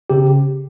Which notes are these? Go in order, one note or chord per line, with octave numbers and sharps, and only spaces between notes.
C#3 G4